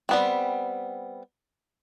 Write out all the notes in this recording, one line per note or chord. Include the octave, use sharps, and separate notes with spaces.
G3 B3 C4